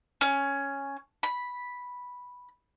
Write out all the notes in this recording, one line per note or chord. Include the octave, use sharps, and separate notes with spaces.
C#4
B5